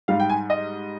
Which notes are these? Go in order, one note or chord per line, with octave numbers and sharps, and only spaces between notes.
G#2 G3 F5
G5
G#5
D#5